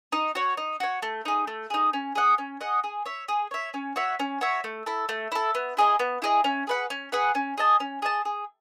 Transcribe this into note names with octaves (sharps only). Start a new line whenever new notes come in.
D#4
F#4 C#5
D#4
F#4 C#5
A3
D#4 G#4
A3
D#4 G#4
C#4
G#4 D#5 F#5
C#4
G#4 D#5 F#5
G#4
C#5 E5
G#4
C#5 E5
C#4
F#4 C#5 E5
C#4
F#4 C#5 E5
A3
E4 A4
A3
E4 A4
B3
E4 G#4 D#5
B3
E4 G#4 D#5
C#4
G#4 B4 F#5
C#4
G#4 B4 F#5
C#4
G#4 D#5 A5
C#4
G#4 D#5 A5
G#4